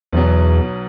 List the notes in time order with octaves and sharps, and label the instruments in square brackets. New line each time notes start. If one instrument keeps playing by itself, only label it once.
[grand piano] B1 B2 F#3 B3 [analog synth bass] E2